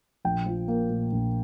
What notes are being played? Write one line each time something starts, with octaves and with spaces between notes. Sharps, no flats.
A#1 G5
F3
A#3
A#2
A#1